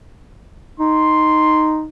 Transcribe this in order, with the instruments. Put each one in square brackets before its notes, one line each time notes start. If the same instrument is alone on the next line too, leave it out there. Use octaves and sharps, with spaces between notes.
[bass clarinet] D#4 [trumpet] C6